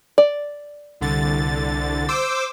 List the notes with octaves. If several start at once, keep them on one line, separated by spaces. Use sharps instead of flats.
D5
C2 D3 A6
C5 D6 E6